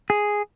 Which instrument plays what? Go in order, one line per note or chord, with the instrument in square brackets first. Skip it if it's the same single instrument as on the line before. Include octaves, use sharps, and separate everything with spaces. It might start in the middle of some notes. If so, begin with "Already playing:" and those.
[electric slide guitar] G#4